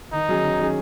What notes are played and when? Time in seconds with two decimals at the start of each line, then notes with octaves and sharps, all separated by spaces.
0.13 D#3 D#4
0.29 F#3 C#4 G#4
0.43 D#3
0.59 F#3 C#4 G#4